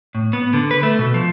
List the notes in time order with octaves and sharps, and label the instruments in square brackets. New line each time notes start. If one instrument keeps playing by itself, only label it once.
[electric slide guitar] A2
B3
D3
B4
A3
B2
F3